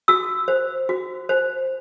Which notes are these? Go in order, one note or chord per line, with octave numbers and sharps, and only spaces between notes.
F#4 E6
C5
F#4
C5